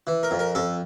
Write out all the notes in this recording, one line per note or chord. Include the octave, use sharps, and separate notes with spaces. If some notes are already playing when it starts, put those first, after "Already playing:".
E3
A#4
F2
A#4
F2 A4